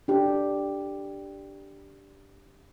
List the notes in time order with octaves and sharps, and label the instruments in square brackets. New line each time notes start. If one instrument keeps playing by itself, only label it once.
[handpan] D4 G4